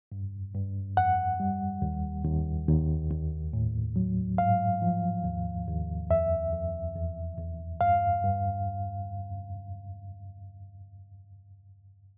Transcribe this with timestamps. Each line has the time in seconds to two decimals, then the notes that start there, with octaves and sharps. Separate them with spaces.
0.12 G2
0.55 G2
0.97 F2 F#5
1.40 G3
1.82 D#2
2.25 D#2
2.68 D#2
3.10 D#2
3.53 A2
3.96 F#3
4.38 G#2 F5
4.82 F3
5.25 D#2
5.68 D#2
6.10 F2 E5
6.53 F2
6.96 E2
7.38 E2
7.81 G2 F5
8.23 G2